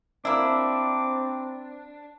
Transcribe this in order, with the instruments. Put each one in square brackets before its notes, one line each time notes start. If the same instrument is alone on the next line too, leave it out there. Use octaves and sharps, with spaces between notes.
[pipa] A#3 E4 [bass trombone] C4 [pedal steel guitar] D4 [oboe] D6